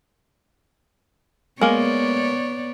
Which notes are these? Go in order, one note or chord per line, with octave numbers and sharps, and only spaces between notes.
G#3 A#3 B3 C#5 D5